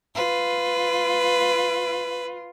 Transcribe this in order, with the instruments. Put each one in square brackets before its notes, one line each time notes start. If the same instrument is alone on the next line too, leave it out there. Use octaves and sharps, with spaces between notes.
[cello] F4 [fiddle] B4